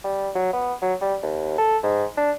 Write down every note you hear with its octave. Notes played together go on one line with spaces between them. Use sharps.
G3
F#3
B3
F#3
G3
D#2
A4
G#2
D4